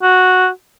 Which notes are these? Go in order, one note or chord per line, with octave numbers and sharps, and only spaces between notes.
F#4